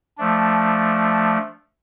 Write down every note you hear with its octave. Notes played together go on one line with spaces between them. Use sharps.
F3 A3 D4